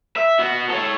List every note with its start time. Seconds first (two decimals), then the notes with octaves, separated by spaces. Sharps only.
0.17 E5
0.39 B3 F#4
0.70 A4 C#5